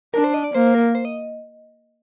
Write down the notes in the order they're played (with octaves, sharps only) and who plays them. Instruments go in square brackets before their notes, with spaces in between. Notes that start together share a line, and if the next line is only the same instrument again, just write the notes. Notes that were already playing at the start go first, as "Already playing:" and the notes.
[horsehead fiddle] D4 [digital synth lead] A#4
[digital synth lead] C5
D#5
D5
[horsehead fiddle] A#3 [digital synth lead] C5
[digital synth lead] A#4
C5
D#5